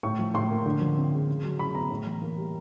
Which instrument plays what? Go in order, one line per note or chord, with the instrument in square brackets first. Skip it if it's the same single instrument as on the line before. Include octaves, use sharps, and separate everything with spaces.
[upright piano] A2 C#6
F3
A2 C6
A#3
D3
F3
C4
G#3
C#3
F#3
C#3 B5
B3 A#5
A2
E3
A#3
G3